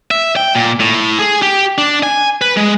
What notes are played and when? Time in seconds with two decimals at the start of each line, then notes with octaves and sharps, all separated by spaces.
0.11 E5
0.36 G5
0.55 A#2
0.80 A2
1.19 G#4
1.42 G4
1.78 D4
2.03 G#5
2.42 B4
2.57 G#3